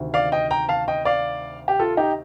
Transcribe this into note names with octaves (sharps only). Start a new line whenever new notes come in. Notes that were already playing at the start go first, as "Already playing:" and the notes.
Already playing: D2 C3 D#3
D5 F5
D#5 G5
G5 A#5
F5 A5
D#5 G5
D5 F5
G4
F4 A4
D#4 G4